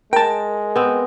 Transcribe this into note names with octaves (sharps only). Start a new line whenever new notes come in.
G#3 A#4 G5 A5
B3 C4